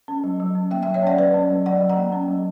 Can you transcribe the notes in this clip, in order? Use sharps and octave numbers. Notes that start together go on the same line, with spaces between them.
C#4
F#3
F#3
C#4
A#3 E5 G5
F#3 E5 G5
C#5 E5
C#4 D5 F#5
F#3 B4 D5
C#4
F#3
F#3 D5 F#5
F#3
F#5 A#5
A#3
C#4
F#3